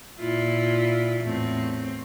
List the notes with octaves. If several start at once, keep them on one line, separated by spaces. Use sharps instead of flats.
A#2 E4 F4
E2 A2 C4